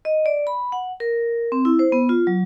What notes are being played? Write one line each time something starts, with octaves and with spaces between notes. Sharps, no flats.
D#5
D5
B5
F#5
A#4
C4
E4
C5
B3
F4
F#3